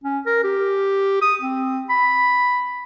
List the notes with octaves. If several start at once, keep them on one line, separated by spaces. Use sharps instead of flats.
C#4
A#4
G4
D#6
C4
B5